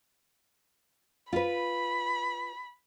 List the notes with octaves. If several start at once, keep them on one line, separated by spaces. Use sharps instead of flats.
F4 B4 B5